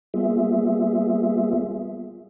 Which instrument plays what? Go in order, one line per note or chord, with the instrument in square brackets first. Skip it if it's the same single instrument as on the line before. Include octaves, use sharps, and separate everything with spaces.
[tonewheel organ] G3 A#3 B3 F4 G#4 E5